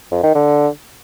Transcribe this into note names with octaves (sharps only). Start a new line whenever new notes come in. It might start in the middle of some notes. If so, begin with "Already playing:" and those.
F2
D#3
D3